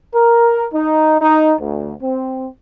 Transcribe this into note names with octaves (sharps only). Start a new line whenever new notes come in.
A#4
D#4
D#4
D2
C4